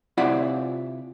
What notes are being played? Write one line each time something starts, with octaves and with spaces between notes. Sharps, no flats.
C3 E4 F4 D5 F#5 B5